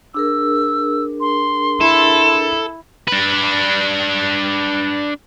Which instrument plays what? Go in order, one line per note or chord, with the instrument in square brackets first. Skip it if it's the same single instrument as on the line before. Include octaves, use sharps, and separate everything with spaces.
[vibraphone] D4 G#4 A#4 [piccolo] E6
[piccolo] C6
[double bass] E4 [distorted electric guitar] A4
[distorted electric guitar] D4 B4